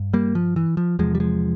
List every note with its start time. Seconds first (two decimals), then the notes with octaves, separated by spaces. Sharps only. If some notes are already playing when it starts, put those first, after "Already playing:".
Already playing: G2
0.14 G3 A#3
0.35 F3
0.56 E3
0.77 F3
0.99 E2 C3 F3 G#3
1.15 G3
1.20 F3 G#3